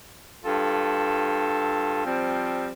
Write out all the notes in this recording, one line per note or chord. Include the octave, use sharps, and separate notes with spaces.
G2 F4 A4
F3 G3 C4